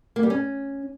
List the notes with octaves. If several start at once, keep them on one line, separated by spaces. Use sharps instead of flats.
A#3
G3
C#4